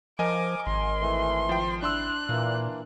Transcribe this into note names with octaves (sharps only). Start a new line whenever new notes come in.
F3 A#4 D#5 G#5 D6
G#1 C6
E3 A3
F3 G5
D4 E4 C6 E6 F#6
A#2 E3 A#3